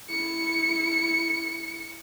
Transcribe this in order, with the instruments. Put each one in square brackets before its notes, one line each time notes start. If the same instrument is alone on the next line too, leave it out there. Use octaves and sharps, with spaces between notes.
[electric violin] E4 C#7